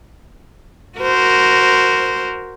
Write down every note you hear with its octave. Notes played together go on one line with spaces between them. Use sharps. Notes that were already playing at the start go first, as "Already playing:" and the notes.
F#4 A#4 C5